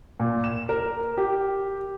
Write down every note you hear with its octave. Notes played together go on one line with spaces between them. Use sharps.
A#2
E7
A#4
G4